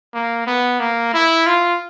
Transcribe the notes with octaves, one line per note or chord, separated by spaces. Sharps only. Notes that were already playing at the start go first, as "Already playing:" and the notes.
A#3
B3
A#3
E4
F4